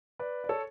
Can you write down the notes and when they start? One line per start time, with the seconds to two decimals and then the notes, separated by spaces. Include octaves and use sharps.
0.19 B4 D5
0.44 D5
0.49 A4 C#5